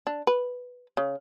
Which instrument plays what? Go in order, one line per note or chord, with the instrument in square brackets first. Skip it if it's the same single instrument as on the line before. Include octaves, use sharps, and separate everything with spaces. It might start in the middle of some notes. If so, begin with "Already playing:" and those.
[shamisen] D4
B4
C#3